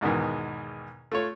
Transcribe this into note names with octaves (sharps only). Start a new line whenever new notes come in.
E2 G#2 B2 D#3 E3
A3 F4 C#5